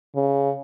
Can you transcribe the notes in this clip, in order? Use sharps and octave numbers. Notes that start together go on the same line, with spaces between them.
C#3